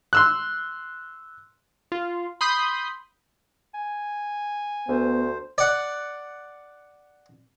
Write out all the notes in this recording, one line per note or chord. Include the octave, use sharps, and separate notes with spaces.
C6 E6 F#6
F4
B5 C6 D#6 G6
G#5
D2 B3 C5
D5 F#5